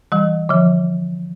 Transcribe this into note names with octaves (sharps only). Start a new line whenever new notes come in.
E3 G3
D3 F3